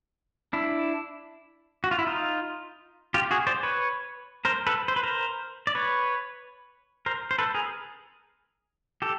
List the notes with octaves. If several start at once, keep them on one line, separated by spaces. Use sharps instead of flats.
D4 E4
F#4
F4
E4
D#4 F4
F4 G4
F#4 G#4
C5 D5
B4 C#5
A#4 C5
A4 B4
C5
B4
A#4 C5
D5
B4 C#5
A#4 C5
C5
A4 B4
G#4 A#4
G4 A4